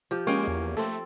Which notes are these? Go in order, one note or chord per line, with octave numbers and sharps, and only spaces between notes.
F3 G4
G#3 A#3 C#4 C#5 G5
E2
A3 C4 A4